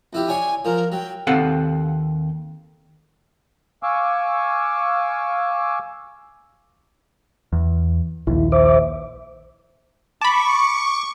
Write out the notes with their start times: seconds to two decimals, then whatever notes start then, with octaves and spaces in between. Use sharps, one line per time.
0.13 F2 E4 G4
0.28 D4 C#5 G#5 C#6
0.65 F3 A#4
0.92 F#3 G5
1.27 D#2 C4 A4 F5 F#5
3.83 F5 G#5 C#6 D6 E6
7.53 E2
8.27 A#1 D#2 E4
8.52 C5 E5 D6
10.21 A5 B5 C#6 D6